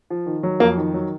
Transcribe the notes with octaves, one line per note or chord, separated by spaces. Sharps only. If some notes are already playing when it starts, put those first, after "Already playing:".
F3
D#3
F#3
F2 A#3
D#3
F#3